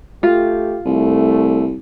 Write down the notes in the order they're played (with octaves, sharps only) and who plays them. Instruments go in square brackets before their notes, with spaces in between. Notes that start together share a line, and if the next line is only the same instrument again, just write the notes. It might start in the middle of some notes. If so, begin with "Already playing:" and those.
[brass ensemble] A3 G4 [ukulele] F4
[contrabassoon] C2 [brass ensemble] A3